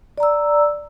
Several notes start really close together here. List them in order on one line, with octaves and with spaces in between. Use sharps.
D5 A#5 E6